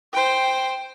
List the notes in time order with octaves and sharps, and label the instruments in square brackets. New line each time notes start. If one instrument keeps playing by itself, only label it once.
[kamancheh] C5 G5